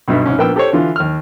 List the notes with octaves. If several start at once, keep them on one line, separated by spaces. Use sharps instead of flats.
B1 G2 B2 E5
C2 G#2 C#4
A#1 A#3 B3 G5 E6
G4 A4 C5 C#5
D3 E3 F4
D#2 F6